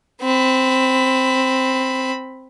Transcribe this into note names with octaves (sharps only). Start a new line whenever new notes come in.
C4 B5